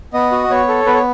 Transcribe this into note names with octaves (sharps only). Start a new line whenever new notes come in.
B3 D#5
F#4
B3 C#5
A4
B3 B4
C#5